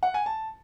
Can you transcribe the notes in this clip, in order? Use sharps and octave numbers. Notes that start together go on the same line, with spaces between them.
F#5
G#5
A5